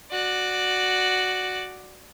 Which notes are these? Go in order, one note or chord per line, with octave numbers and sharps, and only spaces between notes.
F#4 D5